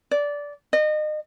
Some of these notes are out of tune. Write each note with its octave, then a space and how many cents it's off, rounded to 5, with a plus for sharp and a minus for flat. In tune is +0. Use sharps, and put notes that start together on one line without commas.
D5 -15
D#5 -30